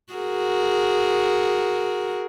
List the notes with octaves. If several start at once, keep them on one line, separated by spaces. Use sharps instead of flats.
F#4 G#4 A#4